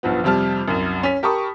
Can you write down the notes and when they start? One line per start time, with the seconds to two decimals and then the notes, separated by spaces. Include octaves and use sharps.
0.03 B1 G2 F3 B3
0.24 F2 C3 G3 A5 F6
0.68 C2 F#2
1.03 C#4 B6
1.23 G4 A#4 A5 B5 C#6 D#6